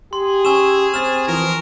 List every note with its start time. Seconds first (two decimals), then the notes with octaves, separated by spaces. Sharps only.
0.13 G4 G#4 C6
0.45 C#4 G#5 C#6 E6 E7
0.94 C4 F6 A6 E7
1.27 E3 F3 A#4 D#6